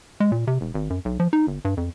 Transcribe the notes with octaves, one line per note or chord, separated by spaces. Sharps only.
G#3
A#2
C3
E1
G#1
F#2
B1
F3
D#4
G1
G2
F2